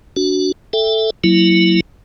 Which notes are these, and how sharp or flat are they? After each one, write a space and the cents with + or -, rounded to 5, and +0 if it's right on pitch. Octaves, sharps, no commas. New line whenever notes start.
D4 -15 F#4 +5
A4 +0 E5 +0 G5 +15
F#3 +0 A#3 -20 E4 +10